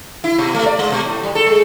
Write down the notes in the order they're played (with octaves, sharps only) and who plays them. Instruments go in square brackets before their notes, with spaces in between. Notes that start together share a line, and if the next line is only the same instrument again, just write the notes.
[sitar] E4
B2
A3
D5
G#3
B2
A2
G3
A4
G#3